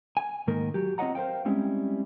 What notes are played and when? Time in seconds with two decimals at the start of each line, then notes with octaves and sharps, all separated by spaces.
0.17 G#5
0.47 G#2 D#3 A#3 A#4
0.74 F#3 G4
0.98 C4 F4 C#5 D#5 F#5 A#5
1.15 A#4 C5 C#5 F5 G5
1.45 G3 G#3 C4 C#4 E4